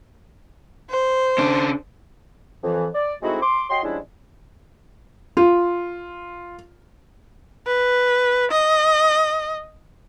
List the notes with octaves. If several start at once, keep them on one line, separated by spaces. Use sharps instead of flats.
C5
C#3 D4
F2 E3
D5
G#3 A3 C4 D#4 E4 F#4
C6 D6
F#4 C#5 D#5 G5 C6
F3 G3 G#3 C#4 D4 E4
F4
B4
D#5